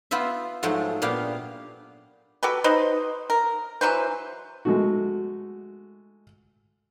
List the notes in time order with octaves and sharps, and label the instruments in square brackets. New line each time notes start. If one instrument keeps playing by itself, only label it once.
[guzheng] B3 F4 B4 C5 E5
G#2 F3 F#3 G#3 A3
A#2 B3 D4 G4 F5
[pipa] F#4 G4 A4 B4
D#4 B4 C5 D#5
A#4
E3 F#3 B4 C5
[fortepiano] G#3 A3 F#4